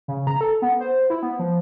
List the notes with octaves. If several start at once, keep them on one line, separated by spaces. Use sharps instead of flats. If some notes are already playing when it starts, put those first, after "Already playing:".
C#3
A#5
A4
B3
C5
E4
B3
F3